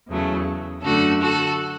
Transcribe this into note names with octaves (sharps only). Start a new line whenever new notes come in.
E2 C#3 F#3 A3
F#2 D3 A3 F#4 A4
F#4 A4